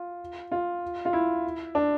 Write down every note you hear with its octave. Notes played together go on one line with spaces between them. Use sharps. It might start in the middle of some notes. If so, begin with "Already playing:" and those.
Already playing: F4
F4
F4
E4
D4